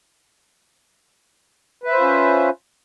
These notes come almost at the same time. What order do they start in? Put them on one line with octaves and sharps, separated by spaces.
B4 E5 C5 F4 C#4